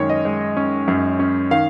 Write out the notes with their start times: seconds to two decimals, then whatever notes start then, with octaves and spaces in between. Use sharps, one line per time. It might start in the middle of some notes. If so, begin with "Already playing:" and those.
Already playing: F#2 D#3 G#3 C#4 C#5
0.09 D#5
0.25 G#3
0.57 C#4
0.88 F#2
1.19 C#4
1.51 D#3 F5